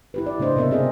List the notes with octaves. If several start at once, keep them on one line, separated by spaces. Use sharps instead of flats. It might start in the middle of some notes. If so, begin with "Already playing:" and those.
E4 G4 B4
D5
C#3 A3 D4 C5 D#5
C3 B3 A#4 D#5 E5
C4 G#4 D#5